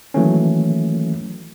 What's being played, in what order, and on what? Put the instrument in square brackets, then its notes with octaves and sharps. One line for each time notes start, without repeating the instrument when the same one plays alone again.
[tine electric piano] D#3 E3 F#3 A3 A#3 C#4